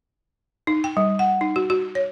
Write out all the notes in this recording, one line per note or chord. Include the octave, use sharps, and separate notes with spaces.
D#4
G5
G3
F#5
D#4
F#4
F#4
C#5